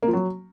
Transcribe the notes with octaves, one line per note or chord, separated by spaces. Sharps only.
A#3
F3
F#3